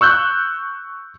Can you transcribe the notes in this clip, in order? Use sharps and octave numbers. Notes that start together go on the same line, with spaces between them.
C#6 E6 F#6 G6